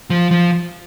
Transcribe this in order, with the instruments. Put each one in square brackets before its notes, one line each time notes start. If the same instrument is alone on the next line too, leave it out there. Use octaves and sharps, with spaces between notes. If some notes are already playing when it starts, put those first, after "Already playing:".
[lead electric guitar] F3
F3